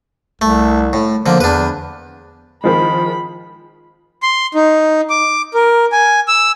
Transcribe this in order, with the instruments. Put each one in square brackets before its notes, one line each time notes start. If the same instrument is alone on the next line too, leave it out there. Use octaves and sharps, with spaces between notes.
[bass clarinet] C2 [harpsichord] A3
[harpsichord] A2
[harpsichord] D3 A#3 [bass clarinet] F3
[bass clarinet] E2 [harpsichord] D4 B4
[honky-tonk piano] D#3 F3 G#3 [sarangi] B5
[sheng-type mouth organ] C6
D#4
D6
A#4
G#5
E6